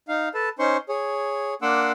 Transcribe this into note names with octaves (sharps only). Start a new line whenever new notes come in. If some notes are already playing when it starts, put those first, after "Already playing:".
D#4 F5
A4 B4 A5
C#4 D#4 C5 C6 C#6
G#4 C#5
A#3 D4 F#5 C6 D6 E6